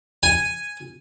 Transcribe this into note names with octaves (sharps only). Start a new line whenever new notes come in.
G#5